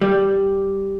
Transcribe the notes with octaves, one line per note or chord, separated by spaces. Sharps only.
G3